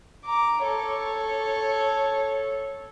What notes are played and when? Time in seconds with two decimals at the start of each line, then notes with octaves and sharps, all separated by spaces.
0.25 A#5 D6
0.63 A4 C#5